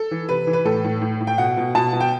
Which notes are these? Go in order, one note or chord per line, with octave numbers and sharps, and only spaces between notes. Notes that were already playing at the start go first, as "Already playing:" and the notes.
Already playing: A4
E3
C3 B4
E3
B4
A2 A4
A2
A2
A2
G5
B2 F#5
B2
B2 A5
B2
G5